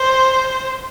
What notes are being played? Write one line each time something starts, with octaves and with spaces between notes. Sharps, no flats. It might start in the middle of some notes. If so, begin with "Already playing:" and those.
Already playing: C5